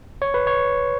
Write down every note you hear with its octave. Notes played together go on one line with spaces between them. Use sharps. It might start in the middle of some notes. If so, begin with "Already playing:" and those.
C#5
B4
C#5